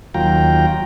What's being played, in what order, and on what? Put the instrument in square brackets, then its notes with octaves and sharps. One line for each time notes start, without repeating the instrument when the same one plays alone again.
[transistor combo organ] D#2 F#3 F4 G5 A#5